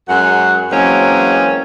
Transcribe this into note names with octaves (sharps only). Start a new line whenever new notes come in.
F#2 G#3 F#4 F#5
E3 F#3 G#3 A#3 C4 C#4